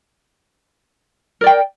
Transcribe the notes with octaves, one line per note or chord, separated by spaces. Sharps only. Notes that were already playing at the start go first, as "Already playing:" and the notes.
A#4 D5 G5